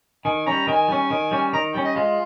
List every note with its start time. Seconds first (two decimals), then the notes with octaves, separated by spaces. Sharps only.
0.25 D#3 G#5
0.46 G3 C#4 A#5
0.67 D#3 G#5
0.88 G3 C#4
1.11 D#3
1.31 G3 C#4
1.53 D#3 A#5
1.74 G3 C#4 G5
1.85 D#5
1.95 G#3 F4